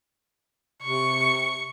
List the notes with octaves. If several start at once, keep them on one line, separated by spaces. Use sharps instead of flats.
C3 C#6